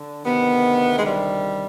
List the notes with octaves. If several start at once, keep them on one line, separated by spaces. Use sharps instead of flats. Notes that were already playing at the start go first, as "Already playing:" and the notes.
Already playing: D3
D2 C3 D#3 B3
G#3
G3